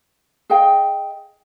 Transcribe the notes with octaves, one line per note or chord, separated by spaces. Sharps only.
G#4 D#5 F5 G5